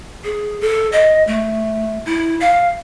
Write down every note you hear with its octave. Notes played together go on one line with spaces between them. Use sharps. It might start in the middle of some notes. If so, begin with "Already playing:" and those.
G#4
A4
D#5
A3
E4
F5